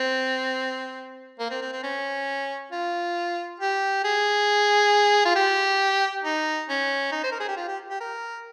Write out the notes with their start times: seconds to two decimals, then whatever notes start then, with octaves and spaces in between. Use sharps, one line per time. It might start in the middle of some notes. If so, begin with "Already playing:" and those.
Already playing: C4
1.39 A#3
1.50 C4
1.61 C4
1.72 C4
1.83 C#4
2.71 F4
3.60 G4
4.04 G#4
5.25 F4
5.35 G4
6.24 D#4
6.69 C#4
7.12 D#4
7.24 C5
7.32 A#4
7.40 G#4
7.48 G4
7.56 F4
7.68 G4
7.90 G4
8.01 A#4